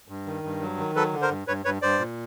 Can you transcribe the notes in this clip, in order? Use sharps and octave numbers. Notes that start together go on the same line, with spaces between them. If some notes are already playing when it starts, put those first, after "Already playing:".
G2
D#3
G2
F#3
D#3
F#3 A4 B4
D3
A#4 C5
G2
G2 B4 C#5
G2 B4 C#5
G2 C5 D5
A#2